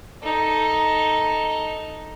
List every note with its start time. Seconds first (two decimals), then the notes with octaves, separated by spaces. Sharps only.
0.23 D#4 A4